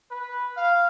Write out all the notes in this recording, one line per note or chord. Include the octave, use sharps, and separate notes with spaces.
B4
F5